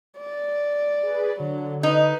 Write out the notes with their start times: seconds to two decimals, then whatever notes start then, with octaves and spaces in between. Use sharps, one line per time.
0.18 D5
1.03 G#4 B4
1.40 D3 F#3
1.83 D#4 B4